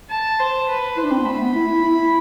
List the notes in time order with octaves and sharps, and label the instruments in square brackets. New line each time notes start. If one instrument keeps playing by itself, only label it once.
[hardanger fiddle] A5
C5
B4
[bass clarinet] E4 [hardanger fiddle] C5
[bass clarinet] D4
C4
B3
[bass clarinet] A3 [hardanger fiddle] B5
[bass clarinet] B3
E4
E4
E4